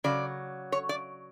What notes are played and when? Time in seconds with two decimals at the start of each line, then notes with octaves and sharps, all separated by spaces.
0.04 C#3 F#3 D5
0.72 C#5
0.89 D5